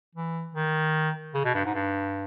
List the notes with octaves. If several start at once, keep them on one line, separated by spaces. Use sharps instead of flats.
E3
D#3
C#3
B2
G2
G#2
G2